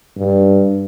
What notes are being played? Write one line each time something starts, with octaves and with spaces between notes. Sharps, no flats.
G2